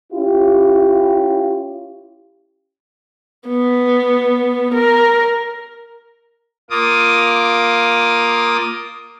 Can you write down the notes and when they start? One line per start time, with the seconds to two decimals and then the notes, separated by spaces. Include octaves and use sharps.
0.12 C#4 E4 F4 G4
3.49 B3
4.74 A#4
6.70 A#3 F4 D6 D#6